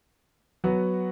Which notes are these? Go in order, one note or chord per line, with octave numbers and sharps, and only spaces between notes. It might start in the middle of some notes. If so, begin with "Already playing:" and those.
F#3 B3 F#4